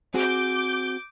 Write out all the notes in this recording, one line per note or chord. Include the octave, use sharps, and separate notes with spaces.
C4 F#4 G#4 D6 G6